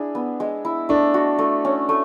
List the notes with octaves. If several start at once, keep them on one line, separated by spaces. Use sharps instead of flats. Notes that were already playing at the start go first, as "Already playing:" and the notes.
Already playing: D4 E4 G#4
B3
G#3
E4
A3 D4
F#4
A3
C#4
A3